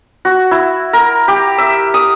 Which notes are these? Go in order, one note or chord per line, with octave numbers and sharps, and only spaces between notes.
F#4
E4
A#4
G4
E5
D#6